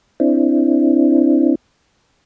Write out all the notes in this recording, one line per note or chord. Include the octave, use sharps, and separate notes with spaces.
C4 D4 E4